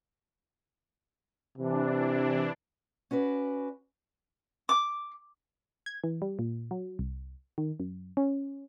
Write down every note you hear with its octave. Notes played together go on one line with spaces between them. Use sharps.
C3 E3 D4
C#4 F#4 B4 D5
D6
G#6
E3
G3
A#2
F#3
C2
D#3
F#2
C#4